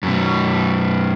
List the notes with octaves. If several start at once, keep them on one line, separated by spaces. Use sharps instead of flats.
F#2 B2